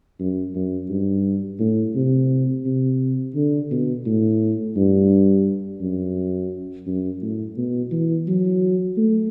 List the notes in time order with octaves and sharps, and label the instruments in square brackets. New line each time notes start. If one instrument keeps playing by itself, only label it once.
[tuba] F#2
F#2
G2
A2
C3
C3
D3
B2
A2
G2
F#2
F#2
A2
B2
E3
F#3
A3